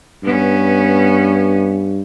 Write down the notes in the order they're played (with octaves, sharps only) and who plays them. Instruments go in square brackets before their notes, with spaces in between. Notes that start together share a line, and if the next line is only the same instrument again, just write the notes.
[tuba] G2 [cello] B3 C#4